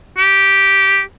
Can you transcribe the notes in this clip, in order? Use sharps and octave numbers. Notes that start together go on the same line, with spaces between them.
G4